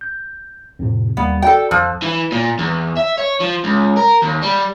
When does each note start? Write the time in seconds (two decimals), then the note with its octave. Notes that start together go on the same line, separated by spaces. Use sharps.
0.01 G6
0.79 F2 A2 C3
1.17 D#2 G3 A#3 B3
1.42 F#4 A4 D5 G5
1.71 F2 F3 E6 F#6
2.02 E3
2.32 A#2
2.59 E2
2.97 E5
3.18 C#5
3.41 F3
3.64 C#2
3.97 A#4
4.22 D#2
4.42 G3